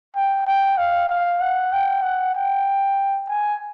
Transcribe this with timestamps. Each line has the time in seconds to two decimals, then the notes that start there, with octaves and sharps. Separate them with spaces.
0.16 G5
0.46 G5
0.78 F5
1.09 F5
1.41 F#5
1.73 G5
2.03 F#5
2.35 G5
3.29 G#5